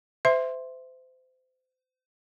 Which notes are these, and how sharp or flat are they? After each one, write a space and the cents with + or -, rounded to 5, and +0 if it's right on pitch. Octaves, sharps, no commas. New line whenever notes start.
C5 -35 E5 +0 C6 +0